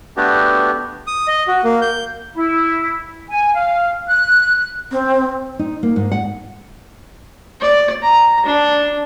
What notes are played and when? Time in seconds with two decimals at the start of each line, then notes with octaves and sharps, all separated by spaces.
0.17 A3 B3 D4 F#4 G4
1.07 D#6
1.28 D#5
1.48 F#4
1.64 A#3
1.82 G6
2.34 E4
3.29 G#5
3.54 F5
4.08 F#6
4.91 C4
5.59 D#4
5.83 A#3
5.96 G#2
6.12 F#5
7.61 D5
8.03 A#5
8.46 D4